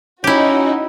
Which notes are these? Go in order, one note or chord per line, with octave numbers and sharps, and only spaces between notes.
C#4 D#4 E4 F#4 G4